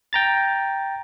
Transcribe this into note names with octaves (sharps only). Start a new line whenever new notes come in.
G5 A#5 A6